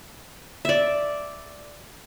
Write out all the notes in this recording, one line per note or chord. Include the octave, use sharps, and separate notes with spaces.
D5 E5